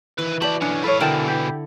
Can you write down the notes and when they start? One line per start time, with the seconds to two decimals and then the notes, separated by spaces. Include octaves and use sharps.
0.18 D#3 E3 B4
0.42 F#4 G4 D5 A5 B5
0.62 B1 C#4 D4
0.84 A4 B4 C#5 F5
1.00 B2 D3 E3 E4 A#4 G5 A5
1.28 G4